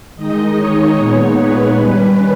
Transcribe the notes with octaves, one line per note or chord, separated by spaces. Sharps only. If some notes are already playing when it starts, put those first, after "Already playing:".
D#3 G#3 D#4 D#5
C#5
A#2 G#3 B3 D#4 C#5
B4
D#3 G3 C#4 B4